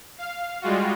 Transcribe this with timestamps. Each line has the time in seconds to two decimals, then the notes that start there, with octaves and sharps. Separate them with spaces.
0.18 F5
0.61 G3 G#3 F4 F#4